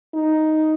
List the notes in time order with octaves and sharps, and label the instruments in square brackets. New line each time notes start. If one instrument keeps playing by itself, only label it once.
[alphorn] D#4